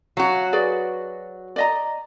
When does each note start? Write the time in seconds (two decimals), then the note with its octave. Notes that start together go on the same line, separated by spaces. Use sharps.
0.17 F#3 F#4 F5
0.53 G#4 B4 D5
1.56 D5 D#5 A#5